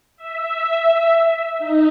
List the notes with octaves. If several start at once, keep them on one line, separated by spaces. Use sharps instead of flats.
E5
D#4